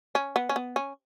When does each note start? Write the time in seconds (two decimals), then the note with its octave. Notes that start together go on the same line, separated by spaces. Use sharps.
0.15 C#4
0.36 B3
0.49 C#4
0.56 B3
0.76 C#4